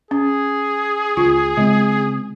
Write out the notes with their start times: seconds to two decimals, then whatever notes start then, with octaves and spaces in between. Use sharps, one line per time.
0.11 C#4 G#4
1.17 C#2 F4
1.57 C#3 G#3 C4